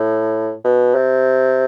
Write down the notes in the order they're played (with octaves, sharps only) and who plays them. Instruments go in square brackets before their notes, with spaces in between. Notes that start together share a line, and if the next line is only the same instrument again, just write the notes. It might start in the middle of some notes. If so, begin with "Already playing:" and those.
Already playing: [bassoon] A2
B2
C3